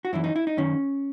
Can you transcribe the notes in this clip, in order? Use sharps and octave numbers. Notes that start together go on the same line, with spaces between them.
F#4
F#2 E3 E4
D#4
E4
D#4
F#2 D#3 C#4